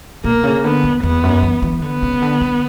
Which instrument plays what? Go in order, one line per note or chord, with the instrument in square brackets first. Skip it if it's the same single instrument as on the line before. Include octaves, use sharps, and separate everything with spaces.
[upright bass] B2 [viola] A#3
[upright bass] C#3
[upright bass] D3 [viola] B3
[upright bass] E2
[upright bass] E2 [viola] B3
[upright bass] F#2
E3
E3
[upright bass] D3 [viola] B3
[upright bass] C#3
D3
D3